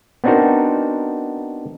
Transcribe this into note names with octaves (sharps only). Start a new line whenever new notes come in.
B3 C4 D4 D#4 F#4 A#4